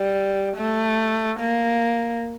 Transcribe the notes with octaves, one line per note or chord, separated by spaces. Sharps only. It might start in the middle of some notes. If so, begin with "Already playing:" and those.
Already playing: G3
A3
A#3